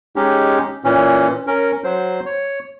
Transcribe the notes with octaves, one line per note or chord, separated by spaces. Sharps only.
G#3 C#4 D#4 G4
A#2 E3 C#4
C#4 A#4
F#3 C5
C#5